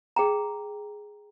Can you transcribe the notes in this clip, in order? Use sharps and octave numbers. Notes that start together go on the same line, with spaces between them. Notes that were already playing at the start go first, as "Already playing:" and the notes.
G#4 G5 A#5